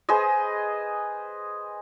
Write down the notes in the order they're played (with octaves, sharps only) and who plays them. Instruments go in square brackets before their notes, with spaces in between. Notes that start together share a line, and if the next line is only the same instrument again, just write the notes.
[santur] G#4 B4 C5 D#5